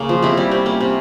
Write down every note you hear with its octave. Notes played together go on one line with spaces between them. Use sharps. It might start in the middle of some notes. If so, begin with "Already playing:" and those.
Already playing: C#3 A#3 C#4
F3
C3 E4
G3 C#4
C3 C4
A#3 C#4
C3